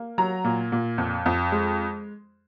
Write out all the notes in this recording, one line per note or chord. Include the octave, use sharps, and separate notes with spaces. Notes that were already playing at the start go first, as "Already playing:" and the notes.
Already playing: A#3
F#3 A#5
A#2
A#2
F2
F2
G#3